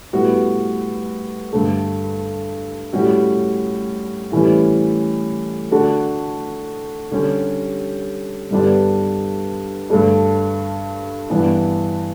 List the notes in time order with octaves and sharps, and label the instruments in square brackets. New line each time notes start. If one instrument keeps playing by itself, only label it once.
[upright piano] A2 G3 B3 F#4
G2 D3 A3
A2 G3 C#4 F#4
A2 E3 G3 C#4
D3 A3 D4 F#4
D3 G3 C#4 G4
G2 D3 G3 B3 D4
G2 D3 A3 D4
G2 E3 B3 D4